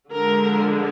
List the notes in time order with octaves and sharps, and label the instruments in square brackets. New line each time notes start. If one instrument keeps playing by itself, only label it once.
[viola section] D3 F3 G#3 A#4